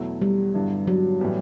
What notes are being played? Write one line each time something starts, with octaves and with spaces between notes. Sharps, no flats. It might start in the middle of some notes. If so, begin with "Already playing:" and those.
Already playing: E2 B2 F#3 A3 E4
G3
G2 D3 F#3 B3 E4
F#3
A2 E3 G3 B3